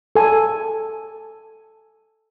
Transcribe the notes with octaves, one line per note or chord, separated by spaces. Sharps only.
A4 G#5